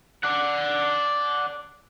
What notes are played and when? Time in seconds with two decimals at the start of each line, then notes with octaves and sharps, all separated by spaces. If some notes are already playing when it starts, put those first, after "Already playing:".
0.23 D5 F#5